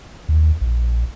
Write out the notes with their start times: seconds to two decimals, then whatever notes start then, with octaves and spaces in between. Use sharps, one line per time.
0.29 D#2
0.61 A#1